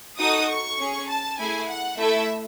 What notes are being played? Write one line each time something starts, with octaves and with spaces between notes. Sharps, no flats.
D#4 F#4 A4 D#6
C#6
C#4 G#4
A5
A3 E4 G#4 G#5
F#5
A3 E4 A4 E5